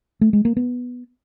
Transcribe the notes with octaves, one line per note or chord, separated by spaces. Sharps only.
A3
G#3
A#3
B3